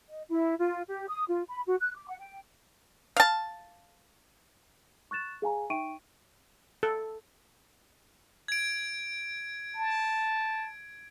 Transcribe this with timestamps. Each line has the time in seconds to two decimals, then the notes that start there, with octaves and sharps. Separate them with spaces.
0.08 D#5
0.28 E4
0.59 F4
0.88 G4
1.08 D#6
1.29 F4
1.49 B5
1.67 F#4
1.80 F#6
1.95 D6
2.09 F#5
2.20 G5
3.17 F5 A5
5.11 C#6 F#6 A6 E7
5.42 G#4 F5 G#5 A#5
5.70 D#4 E5 G5 C#6 D7 D#7
6.83 A4
8.48 G#6 D7
9.75 A5